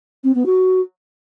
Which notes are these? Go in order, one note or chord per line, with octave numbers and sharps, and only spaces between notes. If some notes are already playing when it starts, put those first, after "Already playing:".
C4
B3
F#4